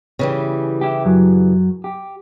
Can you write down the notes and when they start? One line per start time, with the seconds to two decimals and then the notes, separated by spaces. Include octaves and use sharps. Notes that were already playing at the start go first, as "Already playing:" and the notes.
0.19 C#3 E3 G3
0.81 E4 G4
1.05 F#2 F#3
1.84 G4